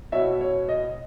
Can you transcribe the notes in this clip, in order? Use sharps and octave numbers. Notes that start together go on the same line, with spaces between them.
B2 C#5 E5
C#5
D#5